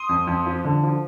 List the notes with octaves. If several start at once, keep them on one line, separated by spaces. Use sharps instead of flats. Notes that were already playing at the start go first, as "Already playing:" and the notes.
Already playing: C6 D#6
F2
F2
F3
D3
F3